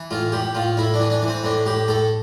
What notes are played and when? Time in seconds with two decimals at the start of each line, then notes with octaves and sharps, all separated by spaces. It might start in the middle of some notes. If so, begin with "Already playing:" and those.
Already playing: E3
0.11 A2 F4
0.32 A2 G4
0.55 A2 F4
0.77 A2 E4
0.94 D4
1.00 E3
1.10 D4
1.22 E3
1.28 C4
1.44 A2 D4
1.66 A2 G4
1.88 A2 A4